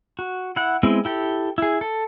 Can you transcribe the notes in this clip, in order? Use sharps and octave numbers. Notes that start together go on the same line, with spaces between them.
F#4
E4 F#5
G#3 B3 C4 E4
E4 G4 A4
E4 G#4
A4